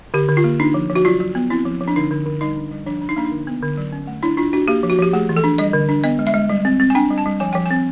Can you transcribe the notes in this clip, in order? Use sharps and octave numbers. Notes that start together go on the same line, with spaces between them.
D3 G4
D3
F4
A#3
D4 D#4
F3
F3
F#4
F#3 F4
F#3
B3
C4 E4
F3
F3
D4
D3 D#4
D3
D3
G3 D#4
D4
G3
F3 D4
D4
D#4
A#3 D4
D#4
D3
B3
D3
F#3
C#4
A3
D4 E4
D4 F4
D4 F#4
A#3 G4
F3
F#4
F3 G4
A3 G#4
E3
A4
D4
G3 D#5
D3
D4
B3 D#5
G#3
E5
G#3
G3
C4
C4
G#5
D4 G5
G3
A5
G3
F3 G#5
F3 G5
C4 G#5